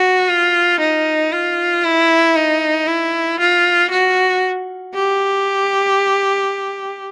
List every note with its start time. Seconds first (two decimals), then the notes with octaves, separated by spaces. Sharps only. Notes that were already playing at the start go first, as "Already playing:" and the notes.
Already playing: F#4
0.28 F4
0.80 D#4
1.32 F4
1.84 E4
2.36 D#4
2.88 E4
3.40 F4
3.91 F#4
4.95 G4